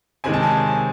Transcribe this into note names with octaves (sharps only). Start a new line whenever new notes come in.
C3 D#3 G#3 C4 G#5
A5
G#5